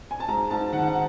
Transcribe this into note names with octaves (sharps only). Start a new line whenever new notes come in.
G#5
A5
G#2 A#5
G#2 A5
D#3 F#5
F#5